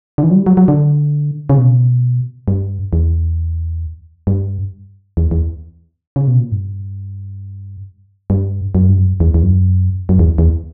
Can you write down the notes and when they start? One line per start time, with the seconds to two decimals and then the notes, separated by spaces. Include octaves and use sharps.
0.18 D3
0.23 E3
0.31 F#3
0.35 G3
0.46 F#3
0.57 F#3
0.68 D3
1.50 C#3
1.58 B2
2.48 G2
2.93 E2
4.27 G2
5.17 E2
5.31 E2
6.16 C#3
6.27 B2
6.40 A#2
6.52 G2
8.30 G2
8.75 F#2
8.89 G2
8.98 F#2
9.20 E2
9.34 E2
9.43 F#2
10.09 F#2
10.19 E2
10.38 E2